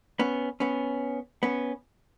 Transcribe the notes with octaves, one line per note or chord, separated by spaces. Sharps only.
B3 C#4
B3 C#4
B3 C#4